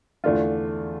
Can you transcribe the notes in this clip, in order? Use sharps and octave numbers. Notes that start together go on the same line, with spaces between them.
E2 D3 A3 D4 F4